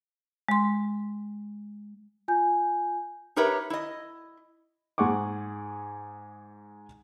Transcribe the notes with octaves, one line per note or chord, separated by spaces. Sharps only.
G#3 C6
F4 G#5 G6
D#4 G4 A#4 B4 C#5 E5
E4 D#5
G#2 G#4 F#5 C#6 D6